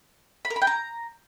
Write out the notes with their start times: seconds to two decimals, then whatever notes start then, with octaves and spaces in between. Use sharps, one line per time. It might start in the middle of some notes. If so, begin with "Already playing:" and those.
0.45 B5
0.50 A#4
0.56 B5
0.62 G5
0.67 A#5